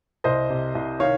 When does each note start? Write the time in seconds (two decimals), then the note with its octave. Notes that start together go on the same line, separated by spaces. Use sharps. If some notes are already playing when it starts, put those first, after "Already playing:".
0.24 C2 C5 D#5
0.50 C3
0.75 C2
1.00 D#3 C#5 F5